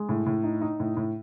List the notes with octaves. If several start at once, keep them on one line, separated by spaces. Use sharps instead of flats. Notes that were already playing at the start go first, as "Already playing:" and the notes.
Already playing: G#3
A2
A2
D#4
D#4
A2
A2